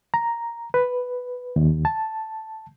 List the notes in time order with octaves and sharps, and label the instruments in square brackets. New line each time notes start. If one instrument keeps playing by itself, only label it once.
[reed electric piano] A#5
B4
D#2
A5